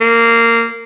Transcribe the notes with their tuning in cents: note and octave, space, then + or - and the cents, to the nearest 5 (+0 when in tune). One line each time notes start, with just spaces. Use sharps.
A#3 -15